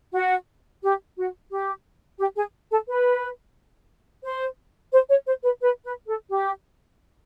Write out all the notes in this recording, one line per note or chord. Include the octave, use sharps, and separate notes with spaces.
F#4
G4
F#4
G4
G4
G#4
A4
B4
C5
C5
C#5
C5
B4
B4
B4
A4
G4